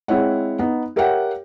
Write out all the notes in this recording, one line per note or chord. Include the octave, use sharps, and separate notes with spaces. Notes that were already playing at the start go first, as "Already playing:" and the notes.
G#3 C4 E4 C#5 F#5
B3 D#4
G4 A#4 C#5 E5 F#5 G5